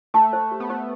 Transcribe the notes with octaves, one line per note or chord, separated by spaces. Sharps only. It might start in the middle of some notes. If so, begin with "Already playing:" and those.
A3 A5
C5
G4
B3
A3 C5